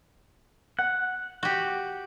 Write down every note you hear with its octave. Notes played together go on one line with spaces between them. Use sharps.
F#5 F#6
F#4 G4